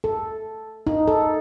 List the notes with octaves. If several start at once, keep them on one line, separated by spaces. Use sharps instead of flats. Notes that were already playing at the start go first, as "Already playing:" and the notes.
A4
D#4
A4